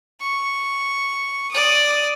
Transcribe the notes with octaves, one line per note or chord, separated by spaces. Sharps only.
C#6
D5 D#6